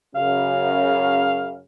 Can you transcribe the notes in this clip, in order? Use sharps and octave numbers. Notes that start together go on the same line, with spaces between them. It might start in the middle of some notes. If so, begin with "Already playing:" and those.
F#2 C#3 F5